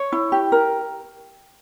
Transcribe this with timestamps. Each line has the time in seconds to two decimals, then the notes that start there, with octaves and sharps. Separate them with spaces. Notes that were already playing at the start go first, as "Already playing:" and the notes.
Already playing: C#5
0.12 E4
0.32 G4
0.52 A#4